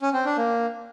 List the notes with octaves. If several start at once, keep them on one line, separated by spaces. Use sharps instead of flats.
C#4
C4
D4
A#3